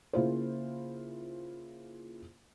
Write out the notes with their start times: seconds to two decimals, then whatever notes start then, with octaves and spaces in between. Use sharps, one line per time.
0.13 C#3 A#3 E4 F4 G#4 C5